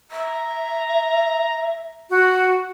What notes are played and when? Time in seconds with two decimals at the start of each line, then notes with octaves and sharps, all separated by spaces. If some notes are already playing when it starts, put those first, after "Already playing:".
0.11 E5 A#5
2.10 F#4